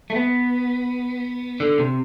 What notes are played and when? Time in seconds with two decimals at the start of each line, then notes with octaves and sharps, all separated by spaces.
0.10 A3
0.16 B3
1.60 D3
1.78 C3